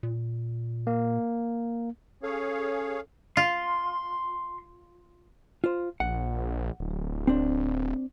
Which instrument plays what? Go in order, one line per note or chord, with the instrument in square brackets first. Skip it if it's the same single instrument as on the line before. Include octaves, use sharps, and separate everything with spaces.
[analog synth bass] A#2
[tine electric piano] A#3
[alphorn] C#4 [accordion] G#4 C#5 F5 [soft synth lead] A4
[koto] F4 [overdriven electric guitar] C6
[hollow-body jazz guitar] F4 C5
[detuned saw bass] A#1 [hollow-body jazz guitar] F#5
[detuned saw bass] D1
[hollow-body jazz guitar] C4 D4